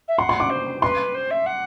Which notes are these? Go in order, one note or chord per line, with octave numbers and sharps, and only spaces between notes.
E5
F#5 C6
C6
D6
C5
B4 C6
C5
E5
F#5